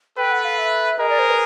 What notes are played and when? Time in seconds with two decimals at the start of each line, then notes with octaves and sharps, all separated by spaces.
0.18 A4 B4 G5
0.31 F#5
0.45 F5
0.58 E5
0.99 G#4 A#4 D#5
1.09 D5
1.19 C5
1.29 B4